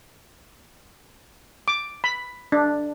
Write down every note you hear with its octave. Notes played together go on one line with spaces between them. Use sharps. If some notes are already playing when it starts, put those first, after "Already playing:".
D6
B5
D4